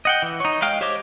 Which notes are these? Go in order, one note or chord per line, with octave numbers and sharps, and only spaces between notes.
D#5 F#5 G5
E3
D#4 C#5
G#3 D#5 F5 G5 F6
G4 C5 C#5 D#5 D6